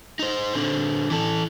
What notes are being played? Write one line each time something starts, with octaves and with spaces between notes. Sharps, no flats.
D#4 C5
D3 C4
E3 A4